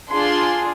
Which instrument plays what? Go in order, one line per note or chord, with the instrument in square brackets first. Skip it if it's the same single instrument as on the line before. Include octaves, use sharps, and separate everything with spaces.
[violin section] D4 F4 G#4 C6